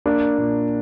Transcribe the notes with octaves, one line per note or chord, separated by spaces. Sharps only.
A#3 D4
A#2